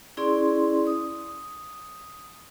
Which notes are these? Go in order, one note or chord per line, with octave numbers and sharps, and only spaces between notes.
C#4 E4 G#4 D5 C6
D#6